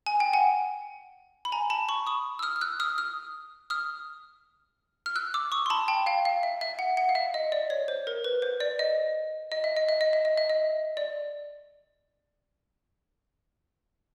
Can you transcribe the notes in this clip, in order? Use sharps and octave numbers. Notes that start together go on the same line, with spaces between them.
G#5
G5
F#5 G#5
B5
G#5 A#5
A5 B5
B5 C#6
C#6 D#6
E6
D#6 F6
F6
E6 F#6
D#6 F6
D#6 F6
D#6 F6
F6
E6 F#6
D6 E6
C#6 D#6
C6
A5 B5
G5 A5
F5 G5
F5
E5
E5
F#5
F#5
F5
E5
D#5
D5
C#5
C5
A#4
B4
C5
D5
D#5
D#5
E5
D#5
E5
D#5
E5
D#5
E5
D#5
D5